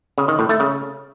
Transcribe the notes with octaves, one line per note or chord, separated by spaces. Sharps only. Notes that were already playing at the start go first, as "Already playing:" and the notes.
C#3
D#3
A2
A3
C#3